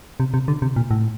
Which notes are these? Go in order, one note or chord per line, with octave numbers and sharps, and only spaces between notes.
C3
C3
D3
C3
A#2
A2